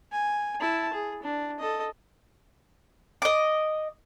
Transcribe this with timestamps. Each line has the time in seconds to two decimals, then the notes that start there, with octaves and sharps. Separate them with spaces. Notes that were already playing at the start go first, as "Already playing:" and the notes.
0.12 G#5
0.60 E4 A5
0.93 G#4
1.23 D4
1.59 A4 D#5
3.22 D#5 D6